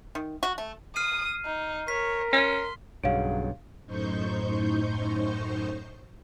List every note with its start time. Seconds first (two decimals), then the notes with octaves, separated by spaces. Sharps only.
0.15 D#3
0.43 F#4
0.58 A3
0.96 D#6 F6 C7 D#7
1.45 D#4
1.88 A#4 C#5 B6
2.33 C#4 C6
3.04 B1 G2 C#3 F#3 F5 D7
3.86 F#2 A2 D#4 C5 C#6 G6